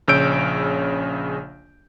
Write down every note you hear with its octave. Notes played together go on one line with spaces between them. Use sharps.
A#1 C#3 C#5 E6 G6 D7